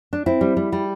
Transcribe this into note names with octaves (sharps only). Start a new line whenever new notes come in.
D4
C4 E4
G3
G3
G3